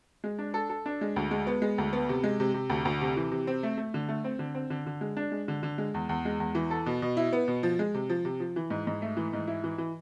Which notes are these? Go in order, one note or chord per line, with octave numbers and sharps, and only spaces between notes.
G#3
D4
A4
A4
D4
G#3
D2
G#3
B3
G#3
D2
B3
C3
G#3
C3
C3
D2
D2
C3
E3
C3
C4
A3
A3
D3
A3
C4
D3
C4
D3
D3
G#3
D4
G#3
D3
D3
G#3
E2
E2
G#3
E2
E3
A4
B2
B2
E4
B3
B2
F3
G#3
C3
F3
C3
F3
E3
G#2
G#2
A3
E3
G#2
E4
E3
E3